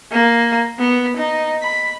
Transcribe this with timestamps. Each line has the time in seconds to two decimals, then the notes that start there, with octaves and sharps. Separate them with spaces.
0.13 A#3
0.79 B3
1.17 D#4
1.63 B5